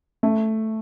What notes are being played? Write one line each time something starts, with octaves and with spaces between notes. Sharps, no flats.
A3